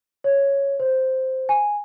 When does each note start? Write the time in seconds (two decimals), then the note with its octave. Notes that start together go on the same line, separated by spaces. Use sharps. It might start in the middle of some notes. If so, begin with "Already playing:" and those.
0.24 C#5
0.80 C5
1.49 G#5